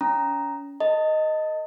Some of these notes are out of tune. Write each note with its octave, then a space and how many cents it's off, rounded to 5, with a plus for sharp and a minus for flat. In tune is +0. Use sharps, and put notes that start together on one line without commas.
C#4 +30 A#5 +0
A4 +45 D#5 +0 A5 +40